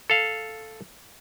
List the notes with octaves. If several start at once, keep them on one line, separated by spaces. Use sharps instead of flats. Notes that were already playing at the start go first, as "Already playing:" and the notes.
A4 F5